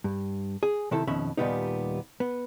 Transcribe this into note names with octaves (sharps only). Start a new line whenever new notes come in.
G2
G#4
C3 D#3 E4 A4
F2 B2 D#3 C#4 E5 B5
D#2 A#2 G3 A#3 B3 D#4
B3